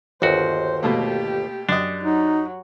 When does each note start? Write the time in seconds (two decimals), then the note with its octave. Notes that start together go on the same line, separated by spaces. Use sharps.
0.22 G1 D#2 F#4 C5
0.83 B2 A3 A#3 G4
1.69 F#2 D4 D#5
2.03 F#3 D#4